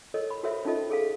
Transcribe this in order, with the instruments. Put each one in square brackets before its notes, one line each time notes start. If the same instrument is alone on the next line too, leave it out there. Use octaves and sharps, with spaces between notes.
[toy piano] A4 A#4 C#5 D#5
B5
F#4 A4 A#4 C5 C#5 E5
C#4 D#4 F4 A4 D#5
G#4 A4 F5